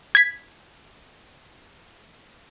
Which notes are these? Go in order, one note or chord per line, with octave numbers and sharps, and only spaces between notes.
G#6 B6